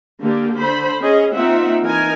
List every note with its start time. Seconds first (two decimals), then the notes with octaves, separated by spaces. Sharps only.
0.19 D3 A#3 G4
0.58 D3 C5 B5
1.01 C#4 G#4 D#5
1.32 A#3 C4 D#4 F4 E5 F#5
1.82 E3 D#4 A#4 G#5